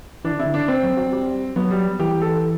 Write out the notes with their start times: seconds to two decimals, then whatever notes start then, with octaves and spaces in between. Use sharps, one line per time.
0.24 E3 D4
0.32 D3
0.39 C3 E4
0.46 D3
0.54 D4
0.68 C4
0.83 F#3
0.97 F#3
1.13 G3
1.56 F#3 B3
1.71 G3
1.99 E3 G4
2.22 A4